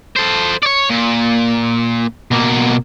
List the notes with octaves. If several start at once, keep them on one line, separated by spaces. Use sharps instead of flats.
A4 C5
C#5 D5
A#2
B2 A#3